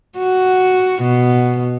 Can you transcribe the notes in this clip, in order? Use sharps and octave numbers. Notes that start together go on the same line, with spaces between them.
F#4
B2